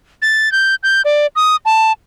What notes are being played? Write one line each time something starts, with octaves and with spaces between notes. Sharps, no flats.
A6
G6
G6
D5
D#6
A5